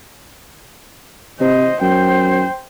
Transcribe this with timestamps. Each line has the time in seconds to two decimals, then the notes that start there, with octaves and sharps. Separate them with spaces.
1.41 C3 C5 D#5
1.81 F#2 C5 G5